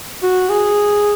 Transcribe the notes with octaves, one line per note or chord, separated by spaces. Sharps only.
F#4
G#4